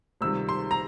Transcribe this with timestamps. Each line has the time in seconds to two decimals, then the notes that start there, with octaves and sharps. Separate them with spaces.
0.21 C#2 C3 D#3 G3 E6
0.49 C6
0.71 A#5